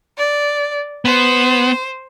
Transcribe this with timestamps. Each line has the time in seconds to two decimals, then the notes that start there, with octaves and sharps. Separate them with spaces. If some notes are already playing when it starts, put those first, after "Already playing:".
0.18 D5
1.05 B3 C5